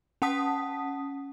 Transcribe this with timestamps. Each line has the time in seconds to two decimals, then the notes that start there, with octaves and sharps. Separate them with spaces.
0.22 C#4 F#5 A5 D#6 B6